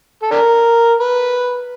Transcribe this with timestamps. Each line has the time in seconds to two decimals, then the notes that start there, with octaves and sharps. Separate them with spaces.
0.23 A4
0.31 D4 A#4
1.00 B4